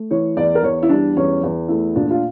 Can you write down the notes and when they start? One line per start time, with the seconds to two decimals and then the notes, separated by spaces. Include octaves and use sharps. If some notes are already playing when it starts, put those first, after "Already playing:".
Already playing: A3
0.11 E3 C#5
0.37 E2 D5
0.55 A#4
0.63 E2 C#5
0.83 E4
0.89 G3 D4
1.16 E2 C#4
1.43 E2
1.68 A3 E4
1.96 A#2 D4
2.10 F4